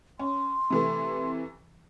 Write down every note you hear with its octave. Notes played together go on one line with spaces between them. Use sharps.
C#4 C6
C3 E3 A3